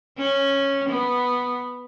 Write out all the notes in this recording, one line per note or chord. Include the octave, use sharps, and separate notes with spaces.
C#4
B3